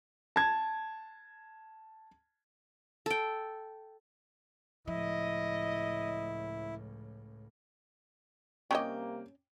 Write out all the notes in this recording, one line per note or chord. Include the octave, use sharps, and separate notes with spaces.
A5 G#6
A4 G5
C#2 A2 F3 E4 D#5
C3 G3 A#3 C#4 C#5 D#5 G5 D6